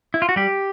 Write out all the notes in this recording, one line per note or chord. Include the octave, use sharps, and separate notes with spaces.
E4
F4
F#4
G3 G4